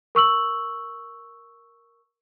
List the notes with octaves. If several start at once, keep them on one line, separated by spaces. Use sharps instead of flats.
A#4 C#6 E6 F#7